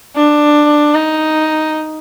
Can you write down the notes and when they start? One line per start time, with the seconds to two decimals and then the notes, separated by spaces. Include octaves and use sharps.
0.16 D4
0.94 D#4